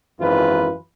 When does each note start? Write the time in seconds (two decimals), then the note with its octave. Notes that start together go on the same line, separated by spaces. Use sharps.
0.19 G#1 F#2 E3 F4 B4